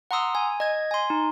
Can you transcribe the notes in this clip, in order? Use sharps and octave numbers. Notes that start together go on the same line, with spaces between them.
F#5 A#5 C6 D#6 E6
G#5
D#5 G#6
G#5 C6
D#4